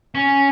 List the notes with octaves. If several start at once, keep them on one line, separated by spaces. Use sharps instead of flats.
C#4